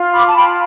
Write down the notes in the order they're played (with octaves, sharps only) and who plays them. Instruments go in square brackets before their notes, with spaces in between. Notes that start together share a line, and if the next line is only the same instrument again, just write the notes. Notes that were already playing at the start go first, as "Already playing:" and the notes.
Already playing: [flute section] F4
B5 D6
A5
F4 G5 B5